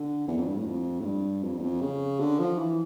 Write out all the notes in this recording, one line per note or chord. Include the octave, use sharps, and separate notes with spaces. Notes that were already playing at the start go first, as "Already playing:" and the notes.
Already playing: D3
E2
F2
G2
A2
F2
A2
G2
F2
E2
F2
C#3
D3
F3
E3